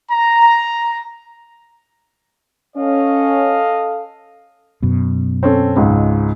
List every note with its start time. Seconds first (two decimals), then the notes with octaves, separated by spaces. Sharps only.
0.11 A#5
2.77 C#4 A4 D#5 F5
4.83 F#2 B2
5.43 C4 C#4 A4
5.76 C#2 G#2